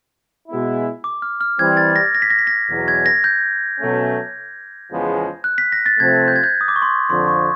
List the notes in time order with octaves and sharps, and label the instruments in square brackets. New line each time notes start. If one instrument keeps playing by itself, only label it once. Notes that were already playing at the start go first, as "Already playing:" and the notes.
[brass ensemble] B2 G#3 B3 E4
[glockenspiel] D6
F6
F6
[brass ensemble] E3 G3 C4 [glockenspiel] G#6
[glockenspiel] A6
A#6
A#6
B6
A#6
B6
A#6
[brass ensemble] E2 B2 F#3
[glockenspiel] G#6
A#6
G6
[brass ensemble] B2 F#3 A3 C#4
E2 C#3 F3 G#3 B3
[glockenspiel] F#6
B6
A#6
A6
[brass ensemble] C3 F3 A3 C4 [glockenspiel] G#6
[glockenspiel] G6
G#6
G6
D#6
D6
C#6
C6
[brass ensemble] F2 D3 F3 [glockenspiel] C6
[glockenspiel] C#6